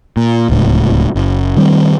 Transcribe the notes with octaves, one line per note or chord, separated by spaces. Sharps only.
A#2
D1 C#2 A2
F#1
D#3 G3 A#3 C4